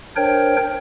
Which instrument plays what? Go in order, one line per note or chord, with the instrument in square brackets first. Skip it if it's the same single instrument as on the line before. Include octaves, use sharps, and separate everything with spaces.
[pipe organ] D4 A#4 C5 C#5 G5